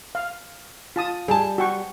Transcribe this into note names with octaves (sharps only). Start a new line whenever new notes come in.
F5
F4 A5 D#6
G3 G#4 A5
F#4 G5 C#6